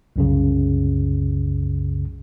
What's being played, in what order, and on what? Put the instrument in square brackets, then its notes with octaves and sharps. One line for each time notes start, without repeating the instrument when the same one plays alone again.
[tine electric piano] C2 F#2 C#3